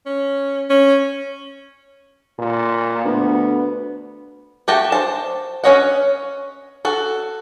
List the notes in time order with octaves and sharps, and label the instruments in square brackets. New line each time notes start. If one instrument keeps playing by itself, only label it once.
[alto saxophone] C#4
C#4
[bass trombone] A#2
[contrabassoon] D2 [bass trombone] B3
[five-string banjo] A3 F#4 G4 G5 A5
C5 A5
C#4 A4 C#5 D#5 F#5
F#4 A4